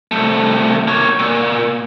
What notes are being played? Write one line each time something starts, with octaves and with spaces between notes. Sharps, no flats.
C2 A3
A#3 C#5
A#2